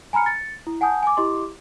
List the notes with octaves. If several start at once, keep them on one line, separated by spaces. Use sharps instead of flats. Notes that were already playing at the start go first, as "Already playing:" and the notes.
G#5 A#5 B5 F6 C#7
A6 C#7
E4
F#5 G#5 A5 D#6 G6
G#5 D6
E4 G4 D#5 C6 D6